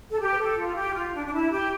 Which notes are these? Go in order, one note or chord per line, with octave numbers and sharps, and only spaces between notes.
A4
G4
B4
A4
F4
G4
F4
D4
D4
E4
G4